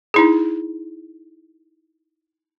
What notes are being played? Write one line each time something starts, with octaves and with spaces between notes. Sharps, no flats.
D#4 E4 G#4